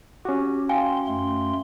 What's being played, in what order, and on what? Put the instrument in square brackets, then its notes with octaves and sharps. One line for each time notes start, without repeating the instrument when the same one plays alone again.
[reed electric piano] C#4 F#4 [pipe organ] G4
[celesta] F5 G5 G#5 [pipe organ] C6
[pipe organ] F#2 A3 C6